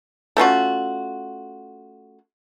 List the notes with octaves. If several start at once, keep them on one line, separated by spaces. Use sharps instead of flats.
A3 C#4 F4 F#4